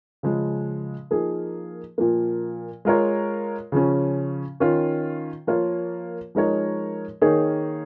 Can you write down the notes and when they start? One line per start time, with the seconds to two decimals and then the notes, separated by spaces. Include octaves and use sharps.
0.23 C#3 F3 G#3
1.11 F3 A#3 D#4 G#4
1.98 A#2 F3 A#3
2.85 G#3 F4 A#4 C#5
3.72 C#3 F3 C#4
4.60 D#3 C#4 F4
5.47 F3 A#3 F4 A#4 C#5
6.35 F3 G#3 D#4 A#4 C#5
7.22 D#3 A#3 D#4 G#4 C#5